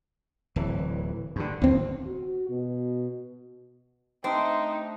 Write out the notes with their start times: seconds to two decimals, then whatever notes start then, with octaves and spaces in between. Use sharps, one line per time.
0.56 D1 E3
1.36 G2 D3
1.62 D1 D#2 C4
2.07 F#4
2.50 B2
4.24 A3 C4 D4 D#4 G4